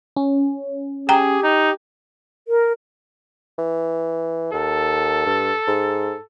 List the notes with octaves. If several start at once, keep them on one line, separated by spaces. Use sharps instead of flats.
C#4
G4 G#4 G5 A#5
D#4
A#4
E3
D#2 A4
G2
G#2